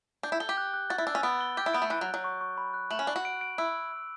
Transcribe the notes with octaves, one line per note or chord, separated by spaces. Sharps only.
D4 G6
E4
A4 G7
G4
F#6
F#6
F#4 A6
E4
D4 E6
C#4
B3 D7
G7
G4 G6
E4
B3 D7
A3
E3 F#6
F#3
F#6
F#3
C#6
C#6
B5
F#6
A3 F#7
C#4
D4 F#6
F#4
D7
D7
E4 E6